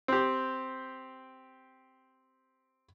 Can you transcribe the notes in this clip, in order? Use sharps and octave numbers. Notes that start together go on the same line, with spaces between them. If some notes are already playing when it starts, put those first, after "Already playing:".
C4 G4